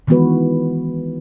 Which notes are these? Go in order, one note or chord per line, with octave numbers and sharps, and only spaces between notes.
D#3 E3 G#3 B3 F#4 B4